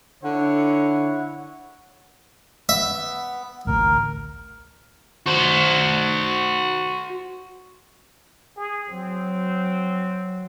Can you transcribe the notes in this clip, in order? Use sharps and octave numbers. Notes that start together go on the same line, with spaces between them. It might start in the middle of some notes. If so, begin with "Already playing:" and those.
D3 E4 C#5 F#5
B3 E5
A1 D2 A#4
F#4 C5
G#4
F#3 C4